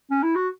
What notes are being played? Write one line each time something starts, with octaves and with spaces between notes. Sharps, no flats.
C#4
E4
F#4